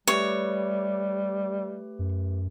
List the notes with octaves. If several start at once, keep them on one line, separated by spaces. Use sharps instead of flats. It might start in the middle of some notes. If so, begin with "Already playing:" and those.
G3 A3 G4 B4 C#5
F#2